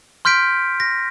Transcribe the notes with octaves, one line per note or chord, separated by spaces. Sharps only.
C6 F6 G6 B6 D7
A#6